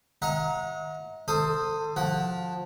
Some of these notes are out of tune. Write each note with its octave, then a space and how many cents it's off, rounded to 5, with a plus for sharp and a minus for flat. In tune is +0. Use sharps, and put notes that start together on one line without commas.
D#5 +45 F#5 -30 A#5 +0
A4 +25 C5 +0 D#6 +0
F3 +20 F#5 +0